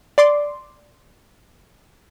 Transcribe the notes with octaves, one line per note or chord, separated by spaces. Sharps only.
D5 C6 D6